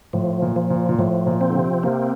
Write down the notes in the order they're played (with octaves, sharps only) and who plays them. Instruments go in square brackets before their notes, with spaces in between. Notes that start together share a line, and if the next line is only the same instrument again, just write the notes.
[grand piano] A2 [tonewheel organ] F3
[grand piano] A#2
[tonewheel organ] F3
[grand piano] A#2
A#2
[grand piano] A2 [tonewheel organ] F3
[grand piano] A#2
[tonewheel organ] C4
[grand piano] D3
C3
[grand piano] C3 [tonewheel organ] A#3